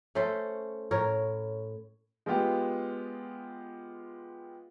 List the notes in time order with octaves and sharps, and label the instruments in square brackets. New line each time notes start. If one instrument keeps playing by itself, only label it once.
[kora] A3 C#4 A4 C5
A2 A#4 C#5
[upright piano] G#3 B3 F4 G4